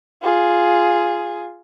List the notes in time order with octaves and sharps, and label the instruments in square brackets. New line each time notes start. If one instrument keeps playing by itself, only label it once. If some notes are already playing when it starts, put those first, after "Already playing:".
[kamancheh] F4 G#4